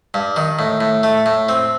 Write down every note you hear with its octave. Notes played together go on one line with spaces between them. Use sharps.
G2
D#3
A2
A2
A3
A2
C4